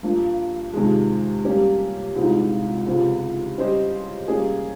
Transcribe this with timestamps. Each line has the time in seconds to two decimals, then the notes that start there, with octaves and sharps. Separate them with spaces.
0.03 G2 F3 A#3
0.74 F2 C3 D#3 G#3
1.44 G3 A#3 C#4 G4
2.15 C2 A#2 G#3 C4 D#4
2.86 C#2 C3 F3 C4
3.57 G3 C#4 G4 C5 D#5
4.28 G3 A#3 C#4 G#4